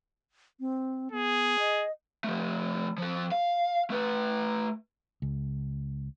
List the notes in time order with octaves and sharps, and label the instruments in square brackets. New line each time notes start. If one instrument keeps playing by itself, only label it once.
[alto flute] C4
[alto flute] B3 [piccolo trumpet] G#4
[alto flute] D#5
[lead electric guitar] F3 A3
F3 A4
F5
A3 B4
[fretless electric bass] C#2